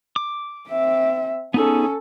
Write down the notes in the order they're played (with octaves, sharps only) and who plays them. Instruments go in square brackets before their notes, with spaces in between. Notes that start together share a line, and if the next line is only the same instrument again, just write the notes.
[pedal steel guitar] D6
[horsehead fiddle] C4 E5
[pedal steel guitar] B3 D#4 G#4 [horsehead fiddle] C#4 A4